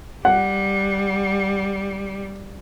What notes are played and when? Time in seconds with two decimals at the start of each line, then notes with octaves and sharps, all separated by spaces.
0.25 G3 F#5